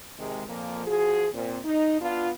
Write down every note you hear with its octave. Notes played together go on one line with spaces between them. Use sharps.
C3 D#3 G#3
F2 A#2 F3 A#3
F3 F#4 G#4
A#2 C4
D#4
B3 D4 F4